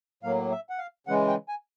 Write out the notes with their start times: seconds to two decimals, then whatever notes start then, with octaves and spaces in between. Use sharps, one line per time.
0.23 A2 F#3 A#3 F5
0.52 E5
0.70 F#5
0.78 F5
1.07 C#3 E3 G#3 F#5
1.28 G5
1.49 G#5